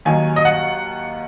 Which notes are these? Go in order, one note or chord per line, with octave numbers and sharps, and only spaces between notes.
D#2 D#3 F#3 G#5
D#5
F#5